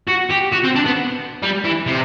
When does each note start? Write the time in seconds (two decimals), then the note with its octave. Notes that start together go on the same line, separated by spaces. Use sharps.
0.09 F#4
0.31 G4
0.53 F#4
0.64 C4
0.76 D4
0.86 B3
1.42 G3
1.64 E3
1.86 C3